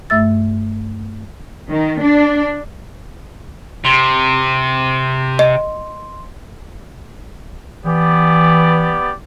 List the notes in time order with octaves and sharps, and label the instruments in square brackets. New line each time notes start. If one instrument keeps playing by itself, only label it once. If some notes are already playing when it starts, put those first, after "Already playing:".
[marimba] G2 A3 E5 E6 A6
[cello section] D#3
D4
[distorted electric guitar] C3 [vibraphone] C6
[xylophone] D#5
[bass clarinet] E3 [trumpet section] B3 G4 D5